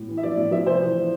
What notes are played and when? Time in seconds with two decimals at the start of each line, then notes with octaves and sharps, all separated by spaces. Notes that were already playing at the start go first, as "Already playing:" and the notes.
Already playing: A2
0.09 E3
0.17 E5
0.23 F3 D5
0.37 A2
0.51 F3 E5
0.66 C3 C5
0.82 E3